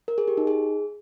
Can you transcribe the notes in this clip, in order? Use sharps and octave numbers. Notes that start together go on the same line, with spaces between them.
A#4
G#4
G4
D#4
G#4